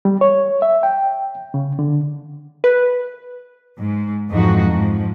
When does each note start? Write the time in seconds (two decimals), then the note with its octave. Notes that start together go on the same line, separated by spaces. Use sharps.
0.05 G3
0.21 C#5
0.62 E5
0.83 G5
1.54 C#3
1.79 D3
2.64 B4
3.80 G#2
4.30 F2 G#2 E3 D#4 F#4
4.71 G#2 F3